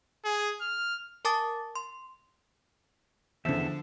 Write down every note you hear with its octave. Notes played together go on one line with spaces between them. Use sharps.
G#4
F6
A#4 G#5 A5 D6 D#6 A6
C6
E2 D3 F3 E5